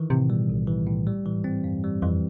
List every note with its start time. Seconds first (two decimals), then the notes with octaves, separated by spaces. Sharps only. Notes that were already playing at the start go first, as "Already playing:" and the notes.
Already playing: D#3 E3
0.10 A2 C3
0.29 B2 G3
0.49 B1
0.68 E3
0.87 A2
1.06 A#2 G3
1.14 A2
1.23 A#2 E3
1.35 G#2
1.44 C4
1.64 E2 G2
1.83 F2 G3
2.02 F2 E3